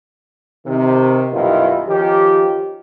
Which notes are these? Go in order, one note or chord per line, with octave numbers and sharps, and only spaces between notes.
C3 D#3
F#2 B2 D#3 G3 E4 F4
D#3 F3 C#4 G4